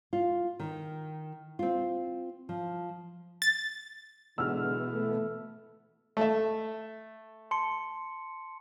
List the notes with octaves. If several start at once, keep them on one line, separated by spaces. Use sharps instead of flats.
F4
D#3
C4 F4
F3
A6
B2 D3 E3 G#3 B3 F#4 E6 F6
A3
A3 E5
A5 C6 C#7